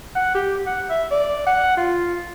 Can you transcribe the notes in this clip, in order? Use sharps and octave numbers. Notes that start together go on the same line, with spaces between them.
F#5
G4
F#5
E5
D5
F#5
F4